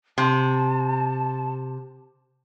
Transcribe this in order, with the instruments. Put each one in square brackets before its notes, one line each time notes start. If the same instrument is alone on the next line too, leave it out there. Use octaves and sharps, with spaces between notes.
[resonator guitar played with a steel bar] C3 [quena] A5